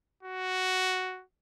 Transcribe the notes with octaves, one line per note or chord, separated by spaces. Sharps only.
F#4